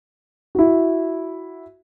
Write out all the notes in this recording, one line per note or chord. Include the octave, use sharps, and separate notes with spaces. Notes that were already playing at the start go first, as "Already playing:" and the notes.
E4 F#4